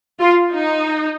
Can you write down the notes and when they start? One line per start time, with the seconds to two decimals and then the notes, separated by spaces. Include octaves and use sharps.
0.20 F4
0.54 D#4